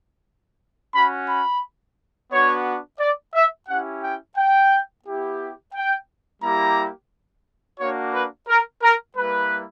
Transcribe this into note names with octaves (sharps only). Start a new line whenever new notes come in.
C#4 F#4 B5
B5
B3 D4 F#4 C#5
D5
E5
C#4 E4 G4 F#5
G5
G5
B3 E4 G4
G5
G3 A#3 E4 G4 A#5
A#3 D4 F#4 C#5
B4
A#4
A#4
G3 A#3 E4 B4